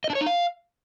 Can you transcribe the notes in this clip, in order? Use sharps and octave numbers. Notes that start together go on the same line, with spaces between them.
D#5
D4
C#5
D#4
F5